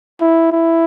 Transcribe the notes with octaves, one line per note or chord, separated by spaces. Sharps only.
E4
E4